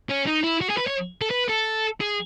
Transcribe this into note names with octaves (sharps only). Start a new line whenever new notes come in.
C#4
D#4
E4
F#4
G#4
B4
C#5
A4
B4
A4
G#4